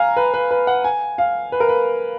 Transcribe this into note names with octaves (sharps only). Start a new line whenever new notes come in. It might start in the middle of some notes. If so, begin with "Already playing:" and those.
Already playing: F5 G#5 A#5
B4
B4
B4
F#5
G#5
F5
B4
A#4
B4